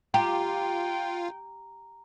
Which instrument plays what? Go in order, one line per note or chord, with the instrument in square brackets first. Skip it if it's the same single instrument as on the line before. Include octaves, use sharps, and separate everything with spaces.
[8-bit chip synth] F4 [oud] G4 [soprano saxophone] G5 [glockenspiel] A#5